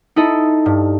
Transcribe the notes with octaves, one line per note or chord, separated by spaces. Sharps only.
D#4 E4 A4 D#5
G2